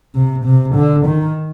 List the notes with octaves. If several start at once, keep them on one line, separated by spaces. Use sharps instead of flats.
C3
C3
D3
D#3